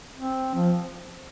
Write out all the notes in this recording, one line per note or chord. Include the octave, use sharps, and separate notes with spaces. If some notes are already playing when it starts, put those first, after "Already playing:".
C4
F3